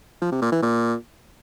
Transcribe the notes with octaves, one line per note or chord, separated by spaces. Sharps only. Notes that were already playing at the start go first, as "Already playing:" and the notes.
F3
C3
A#2
E3
A#2